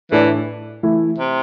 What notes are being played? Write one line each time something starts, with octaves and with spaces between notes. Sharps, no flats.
A2 E3 A3 D4 A4 D5
E3 A3 E4
C3